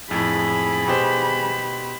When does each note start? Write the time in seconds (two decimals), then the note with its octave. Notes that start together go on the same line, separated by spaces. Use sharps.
0.11 F2 A2 G#4 B5
0.88 B2 G4 C5